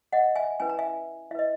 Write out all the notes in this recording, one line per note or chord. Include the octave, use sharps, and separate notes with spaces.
D#5 F#5
E5 G#5
C#4 E4 B4 G#5
A#5
E5 G#5
E4 B4 D#5 E5